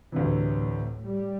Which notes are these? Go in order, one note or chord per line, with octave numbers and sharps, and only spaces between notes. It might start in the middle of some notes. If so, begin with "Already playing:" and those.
D2 A2 C3 E3
G3